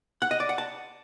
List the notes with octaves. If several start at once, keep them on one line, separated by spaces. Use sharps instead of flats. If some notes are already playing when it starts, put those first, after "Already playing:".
F#5
D#5
D5
F#5
A5